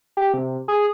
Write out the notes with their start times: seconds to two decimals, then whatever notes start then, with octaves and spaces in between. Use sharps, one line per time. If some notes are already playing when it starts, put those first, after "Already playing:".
0.17 G4
0.34 C3
0.68 G#4